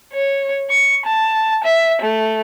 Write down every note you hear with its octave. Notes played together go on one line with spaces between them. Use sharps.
C#5
C#6
A5
E5
A3